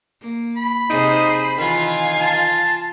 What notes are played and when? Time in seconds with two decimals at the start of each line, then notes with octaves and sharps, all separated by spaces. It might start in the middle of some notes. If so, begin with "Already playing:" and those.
0.22 A#3
0.56 B5
0.90 C3 D#4 G#4 C5 D#7
1.58 D#3 E3 F4 F5 G#5
2.20 F4 A5